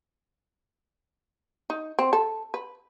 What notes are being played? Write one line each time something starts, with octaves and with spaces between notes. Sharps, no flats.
D#4
C4
A4
B4